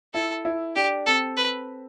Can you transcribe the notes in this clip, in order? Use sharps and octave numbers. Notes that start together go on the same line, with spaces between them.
E4 A4
E4
D4 G4
C4 A4
B4